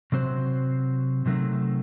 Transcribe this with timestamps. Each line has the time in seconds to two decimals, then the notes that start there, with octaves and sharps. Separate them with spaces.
0.12 C3 F#3 C4 F#4 C5
1.26 C3 D#3 F#3 A3 C4